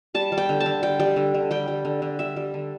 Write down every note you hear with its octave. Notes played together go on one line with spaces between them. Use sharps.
G3 A5
G3
G5
D3
A5
D3
G3 G5
G3
D3
D3
G3 G5
G3
D3
D3
G3 E5
G3
D3